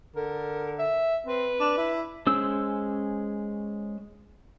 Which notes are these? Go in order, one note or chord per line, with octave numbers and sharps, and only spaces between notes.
D3 A#4
E5
C4 B4
D4
E4
G#3 C#4 C5 E6